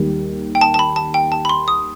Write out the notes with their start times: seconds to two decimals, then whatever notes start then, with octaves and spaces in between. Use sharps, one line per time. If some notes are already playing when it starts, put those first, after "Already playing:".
Already playing: D#2 D#3 G3
0.55 G5
0.61 A5
0.74 A5
0.79 B5
0.96 A5
1.14 G5
1.32 A5
1.45 B5
1.49 C6
1.68 D#6